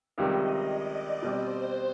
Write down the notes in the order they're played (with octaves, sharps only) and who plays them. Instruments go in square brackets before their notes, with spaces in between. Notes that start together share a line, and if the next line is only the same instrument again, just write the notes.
[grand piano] C#2 C3 D#3 G3 [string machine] D#5
[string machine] D5
[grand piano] B2 G3 C4 [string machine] C5